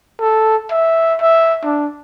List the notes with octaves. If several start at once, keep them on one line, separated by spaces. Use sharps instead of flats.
A4
E5
E5
D4